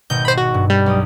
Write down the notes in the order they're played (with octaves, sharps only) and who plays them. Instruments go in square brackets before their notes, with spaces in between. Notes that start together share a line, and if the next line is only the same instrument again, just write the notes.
[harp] G#1 B2 D#5 [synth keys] G6
[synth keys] C5 B5
F#4
[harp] G2
[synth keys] G3
[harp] B1 G4 D#6